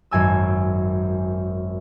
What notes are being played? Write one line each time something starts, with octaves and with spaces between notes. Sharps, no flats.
G#1 F#2 G#5 E6